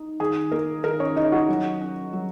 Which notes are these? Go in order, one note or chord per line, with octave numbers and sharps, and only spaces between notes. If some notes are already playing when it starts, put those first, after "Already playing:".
Already playing: D#4
D#3 G#4
A#3 A#4
D#3 A#4
C#4 C#5
D#4 E4 D#5
F#4 F#5
F#3
C#4
F#3